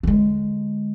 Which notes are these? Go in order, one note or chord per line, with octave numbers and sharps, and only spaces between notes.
D3 G#3